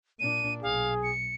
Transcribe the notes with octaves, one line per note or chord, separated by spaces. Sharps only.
A#2 D4 D#7
B1 G#4 F5
C#7